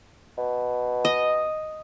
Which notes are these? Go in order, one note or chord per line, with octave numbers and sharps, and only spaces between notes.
B2
D#5